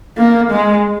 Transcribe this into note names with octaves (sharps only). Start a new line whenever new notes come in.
A#3
G#3